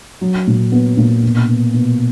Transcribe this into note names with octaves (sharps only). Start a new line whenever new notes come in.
F#3
A#2
B3
A#2
B2
B2
B2